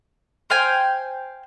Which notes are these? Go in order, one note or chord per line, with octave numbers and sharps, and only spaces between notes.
C5 F5 G5 G#5